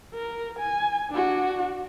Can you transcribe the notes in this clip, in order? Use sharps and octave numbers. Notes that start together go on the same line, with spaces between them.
A#4
G#5
D4 F#4